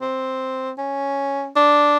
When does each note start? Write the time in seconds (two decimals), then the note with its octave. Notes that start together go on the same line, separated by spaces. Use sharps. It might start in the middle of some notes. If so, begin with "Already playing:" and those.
0.01 C4
0.78 C#4
1.56 D4